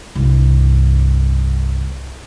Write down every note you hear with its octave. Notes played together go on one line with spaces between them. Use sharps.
C2 G2